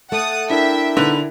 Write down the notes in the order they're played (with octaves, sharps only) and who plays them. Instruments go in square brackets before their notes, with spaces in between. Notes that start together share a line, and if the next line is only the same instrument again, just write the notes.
[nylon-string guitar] A3 [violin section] F#5 A5 D#6
[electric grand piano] D4 E4 A#4 [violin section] E5 G5
[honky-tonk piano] D3 [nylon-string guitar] B3 D#4 B4